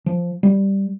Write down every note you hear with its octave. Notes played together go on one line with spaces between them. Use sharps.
F3
G3